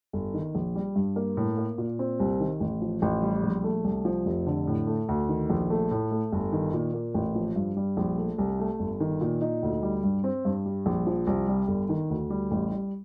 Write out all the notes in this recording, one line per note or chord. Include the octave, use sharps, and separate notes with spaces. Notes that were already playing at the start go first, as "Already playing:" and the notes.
G1
D#3
A#1
G3
G2
A#3
A2
A#3
A#2
C4
C2
D#3
A1
F3
A1
G3
A#1
A3
C2
F3
F1
D3
A2
A3
D2
D#3
A#1
A3
A2
A3
G1
D#3
A#2
A#3
A1
F3
G2
G3
A#1
A3
C2
A3
G1
D#3
A#2
D#4
D2
G3
G2
C4
G2
G3
A#1
F3
C2
G3
G1
D#3
D2
G3
A1
G3